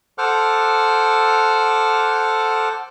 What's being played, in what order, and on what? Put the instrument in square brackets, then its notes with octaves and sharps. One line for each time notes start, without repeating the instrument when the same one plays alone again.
[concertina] A4 C5 F#5 D6 F6